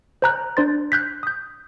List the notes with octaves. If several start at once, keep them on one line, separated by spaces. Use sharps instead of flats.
C5 A#5 F#6
D4 C5 C6 A6
F#6 G6 B6
D#6 G6